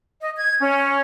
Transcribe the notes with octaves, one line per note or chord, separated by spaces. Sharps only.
D#5
G#6
C#4